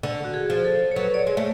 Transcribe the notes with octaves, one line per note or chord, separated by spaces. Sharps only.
D3
F#4
G#4
F3
A4
C#5
F#3 B4
D5
C#5
G#3
A3